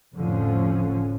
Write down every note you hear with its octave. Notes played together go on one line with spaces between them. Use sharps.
F1 A2 D3 F3 C#4